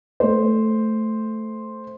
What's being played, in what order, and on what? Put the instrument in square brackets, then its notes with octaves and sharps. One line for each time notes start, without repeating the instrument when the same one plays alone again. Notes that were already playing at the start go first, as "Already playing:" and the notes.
[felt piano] A3 C5